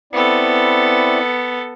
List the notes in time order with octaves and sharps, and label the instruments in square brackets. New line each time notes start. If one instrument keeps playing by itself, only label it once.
[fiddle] B3 A4 [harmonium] C4 E4 D5